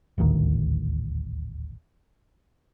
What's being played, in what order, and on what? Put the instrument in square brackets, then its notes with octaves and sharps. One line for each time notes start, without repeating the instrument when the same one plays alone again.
[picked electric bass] D#1 A1 D2 D#3